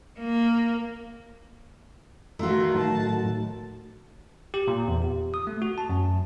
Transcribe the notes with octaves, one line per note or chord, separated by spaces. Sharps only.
A#3
D#3 A3 F4 F#4 A#4
A2 D#3 F#3 A5
G4
A#2
E2
G4
D#6
A3
F#4
A5
F#2